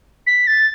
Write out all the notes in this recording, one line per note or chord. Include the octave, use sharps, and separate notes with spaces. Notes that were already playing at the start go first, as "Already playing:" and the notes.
B6
A6